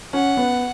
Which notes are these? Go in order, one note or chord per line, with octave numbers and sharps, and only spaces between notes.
C#4 F#5
B3